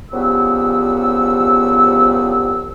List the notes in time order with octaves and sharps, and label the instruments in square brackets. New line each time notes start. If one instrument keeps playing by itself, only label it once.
[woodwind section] C2 C#3 F3 B3 G4 E6